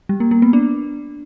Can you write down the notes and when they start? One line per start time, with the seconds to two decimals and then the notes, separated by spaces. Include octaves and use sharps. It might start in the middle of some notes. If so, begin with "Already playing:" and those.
0.09 G3
0.20 A#3
0.31 A#3
0.42 B3
0.53 D4